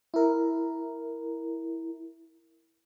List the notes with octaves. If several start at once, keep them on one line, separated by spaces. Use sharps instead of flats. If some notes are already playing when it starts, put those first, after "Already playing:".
E4 A#4